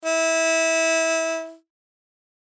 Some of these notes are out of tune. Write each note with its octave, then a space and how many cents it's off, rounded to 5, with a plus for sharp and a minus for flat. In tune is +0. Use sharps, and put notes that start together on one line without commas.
E4 -20